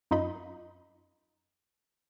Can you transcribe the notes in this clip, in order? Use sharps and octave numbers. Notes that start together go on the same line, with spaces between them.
F#2 D#4 F4 D#5 B5